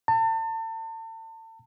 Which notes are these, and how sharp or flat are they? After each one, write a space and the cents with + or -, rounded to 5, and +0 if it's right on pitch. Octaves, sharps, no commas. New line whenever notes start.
A5 +35